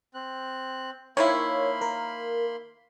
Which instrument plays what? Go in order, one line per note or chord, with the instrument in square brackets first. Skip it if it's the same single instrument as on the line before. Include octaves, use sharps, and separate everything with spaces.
[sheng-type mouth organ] C4 F#6
[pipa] D#3 F3 E4 [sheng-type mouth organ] A#3 B5 C6 [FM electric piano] C#5
[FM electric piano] A#4